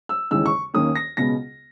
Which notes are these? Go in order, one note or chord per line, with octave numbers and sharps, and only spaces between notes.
E6
D#2 C#3 E3 G#3 E6
C#6
D#2 D#3 A#3 C#4 D#6
A#6
C#2 B2 G#3 B3 A#6